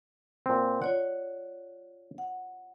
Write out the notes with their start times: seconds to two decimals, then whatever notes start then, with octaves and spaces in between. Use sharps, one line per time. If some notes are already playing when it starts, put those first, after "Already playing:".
0.46 A#2 C4
0.82 F4 C#5 D5 F#5
2.18 F#5